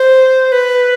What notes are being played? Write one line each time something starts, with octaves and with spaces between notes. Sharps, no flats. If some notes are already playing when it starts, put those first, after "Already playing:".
Already playing: C5
B4